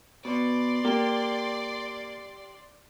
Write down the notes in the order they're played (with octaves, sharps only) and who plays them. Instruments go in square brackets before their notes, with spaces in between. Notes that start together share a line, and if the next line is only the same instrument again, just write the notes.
[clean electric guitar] B2 [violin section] D5 C6
[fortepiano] A#3 [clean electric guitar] G4